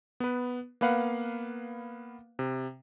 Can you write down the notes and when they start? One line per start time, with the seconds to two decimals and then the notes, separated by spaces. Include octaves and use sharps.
0.20 B3 B4
0.81 A#3 B3 B4 F5 F#5
2.39 C3